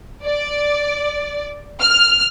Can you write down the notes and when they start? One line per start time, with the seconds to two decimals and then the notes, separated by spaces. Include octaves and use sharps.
0.24 D5
1.83 F6